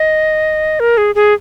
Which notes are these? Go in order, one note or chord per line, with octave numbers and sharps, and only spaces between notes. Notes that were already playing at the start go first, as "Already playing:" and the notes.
Already playing: D#5
A#4
G#4
G#4